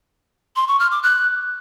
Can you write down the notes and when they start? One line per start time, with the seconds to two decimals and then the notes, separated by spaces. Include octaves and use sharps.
0.56 C6
0.68 C#6
0.80 F6
0.91 D6
1.03 F#6